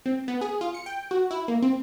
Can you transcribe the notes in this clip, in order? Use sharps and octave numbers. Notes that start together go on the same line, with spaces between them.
C4
B3
G#4
F4
C#7
G5
F#4
E4
A#3
C4